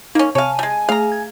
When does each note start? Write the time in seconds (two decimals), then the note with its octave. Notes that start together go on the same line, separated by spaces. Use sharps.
0.15 A#3 C#4 D#4
0.35 C3 C#5 F5 G#5 A5 D#7
0.59 G3 G#3
0.89 A3 G#4 F5 A#5
1.12 G#6